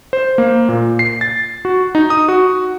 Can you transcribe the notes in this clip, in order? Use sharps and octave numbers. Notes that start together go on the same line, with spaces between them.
C5
A#3
A#2
C7
A6
F#4
D#4
D#6
F#4